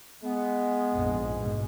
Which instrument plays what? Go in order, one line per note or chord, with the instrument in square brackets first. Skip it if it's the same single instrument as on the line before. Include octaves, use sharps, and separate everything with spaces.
[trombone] G#3 [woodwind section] B3
[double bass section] A#1 F2 G#2
G#2 B2